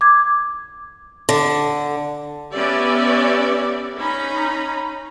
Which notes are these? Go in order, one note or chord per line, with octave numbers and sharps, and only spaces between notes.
D6 G#6
D3
B3 C#4 G4 C#5 D5 E5
C#4 D#4 A#5 B5